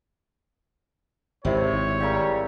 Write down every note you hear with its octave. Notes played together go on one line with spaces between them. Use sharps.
G#1 C3 E4 C#5
C#3 G3 C4 A#4